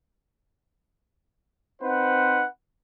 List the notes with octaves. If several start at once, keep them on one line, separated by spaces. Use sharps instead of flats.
C4 D#4 B4 C5 F#5